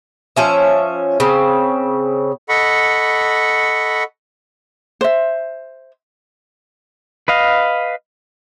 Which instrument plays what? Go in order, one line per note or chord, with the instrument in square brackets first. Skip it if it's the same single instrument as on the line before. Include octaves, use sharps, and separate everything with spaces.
[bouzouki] F3 C#4 E5
C#3 C4
[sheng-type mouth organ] A4 D#5 F#5 B5 C#6
[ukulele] C5 E5
[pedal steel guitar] B4 D#5 F5